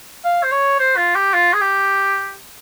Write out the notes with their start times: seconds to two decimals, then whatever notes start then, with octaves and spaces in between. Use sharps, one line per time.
0.25 F5
0.43 C5
0.51 C#5
0.79 C5
0.96 F4
1.15 G4
1.33 F4
1.54 G#4
1.61 G4